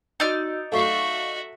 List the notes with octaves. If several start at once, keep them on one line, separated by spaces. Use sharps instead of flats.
D#4 F#4 D5 D#5 E6 F6
F#3 A3 F#4 A4 E5 F5 C#6 C7